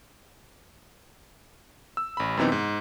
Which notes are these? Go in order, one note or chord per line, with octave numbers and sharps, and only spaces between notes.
E6
A1 B5
F#2 C3 E3 B3 C4 D#4
G#2